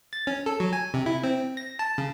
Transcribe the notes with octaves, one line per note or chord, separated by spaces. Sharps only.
A6
C#4
A4
F#3
G#5
C3
E4
C4
A#6
A5
C#3